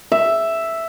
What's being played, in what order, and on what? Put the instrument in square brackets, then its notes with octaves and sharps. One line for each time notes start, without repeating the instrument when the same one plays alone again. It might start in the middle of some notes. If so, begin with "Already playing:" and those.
[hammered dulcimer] E5